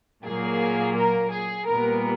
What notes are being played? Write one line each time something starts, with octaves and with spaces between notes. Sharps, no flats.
A#2 F#3 A#3 G#4
A#4
G#4
A#2 G3 B3 A#4